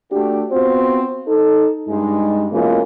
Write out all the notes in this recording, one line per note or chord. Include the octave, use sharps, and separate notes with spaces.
A3 D4 F#4 G4
B3 C4 F4 F#4 C5
D#4 A4
G2 G#3 D#4
B2 E3 G#3 A#3 C#4 F4